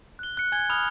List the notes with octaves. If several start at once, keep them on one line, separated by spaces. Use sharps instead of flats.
F#6 G7
F#6 C#7
G#5 G#6 G7
B5 D#6 F6 F7 G7